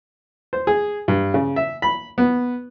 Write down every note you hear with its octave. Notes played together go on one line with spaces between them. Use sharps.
C5
G#4
G2
C#3
E5
B5
B3